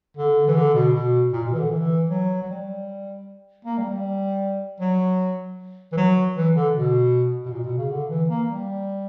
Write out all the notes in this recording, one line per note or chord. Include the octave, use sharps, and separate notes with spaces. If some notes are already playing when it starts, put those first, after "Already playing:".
D3
E3
D3
B2
B2
A#2
B2
E3
D3
E3
F#3
F#3
G3
A#3
G3
G3
F#3
E3
F#3
E3
D3
B2
B2
A#2
B2
C#3
D3
E3
A#3
G3